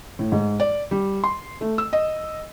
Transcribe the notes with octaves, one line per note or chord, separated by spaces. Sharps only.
A2
G#2
D5
G3
C6
A3
E6
D#5